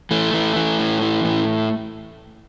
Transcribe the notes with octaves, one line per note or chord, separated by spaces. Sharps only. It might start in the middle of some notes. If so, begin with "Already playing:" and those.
E3 A3
E3
E3
A2
E3
A2